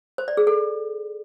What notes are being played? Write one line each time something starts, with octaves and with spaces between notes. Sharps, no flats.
C5
D5
G#4
A4